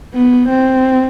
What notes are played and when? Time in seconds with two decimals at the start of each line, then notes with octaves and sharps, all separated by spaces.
0.14 B3
0.49 C4